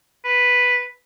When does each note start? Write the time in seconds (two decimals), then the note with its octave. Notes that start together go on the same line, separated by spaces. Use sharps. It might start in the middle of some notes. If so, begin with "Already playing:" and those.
0.25 B4